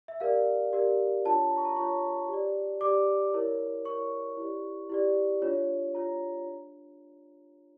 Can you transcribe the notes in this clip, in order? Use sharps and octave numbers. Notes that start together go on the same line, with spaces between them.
E5
G4 A#4 D5 F5
G4 A#4 D5
D4 F4 C#5 A5
A#5
C#6
A#5
D4 F4 C#5 C#6
G4 D5
G4 D5 D6
E4 A#4 C#5
E4 A#4 C#5 C#6
E4 G4 D5
E4 G4 D5
D4 F4 C#5
D4 F4 C#5 A#5
D4